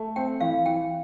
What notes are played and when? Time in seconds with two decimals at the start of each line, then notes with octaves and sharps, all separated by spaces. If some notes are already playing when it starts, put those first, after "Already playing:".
Already playing: A3
0.16 C4 G5
0.41 E3 F5
0.66 E3 G5